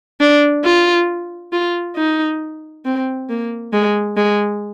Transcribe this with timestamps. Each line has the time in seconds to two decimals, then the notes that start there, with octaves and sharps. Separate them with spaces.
0.20 D4
0.64 F4
1.53 F4
1.96 D#4
2.85 C4
3.30 A#3
3.73 G#3
4.17 G#3